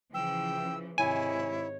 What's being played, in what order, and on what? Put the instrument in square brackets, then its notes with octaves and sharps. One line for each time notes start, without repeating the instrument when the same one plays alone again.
[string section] C#3 E3 F3 [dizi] G5 [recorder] E6
[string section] G#2 C3 D#3 [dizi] E4 [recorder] C#5 [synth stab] G#5